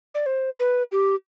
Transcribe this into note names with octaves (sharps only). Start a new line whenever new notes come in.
D5
C5
B4
G4